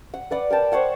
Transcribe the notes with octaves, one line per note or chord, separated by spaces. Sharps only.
F#5
B4 D5 F#5
A#4 G5 A5
C5 C#5 F#5 A5